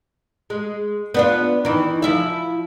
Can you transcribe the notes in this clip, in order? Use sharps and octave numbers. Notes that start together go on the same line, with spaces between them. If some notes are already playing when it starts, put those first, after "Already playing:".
G#3
B3 D4 F4
D#3 E3
F3 E4 E5